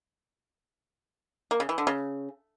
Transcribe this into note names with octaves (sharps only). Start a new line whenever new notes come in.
A#3
C#3
E3
D3
C#3